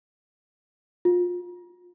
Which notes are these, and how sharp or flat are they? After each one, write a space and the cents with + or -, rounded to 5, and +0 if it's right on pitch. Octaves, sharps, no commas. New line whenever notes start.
F4 +25